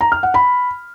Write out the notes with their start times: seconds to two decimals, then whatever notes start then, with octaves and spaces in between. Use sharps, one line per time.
0.01 A#5
0.12 F6
0.23 F#5
0.34 B5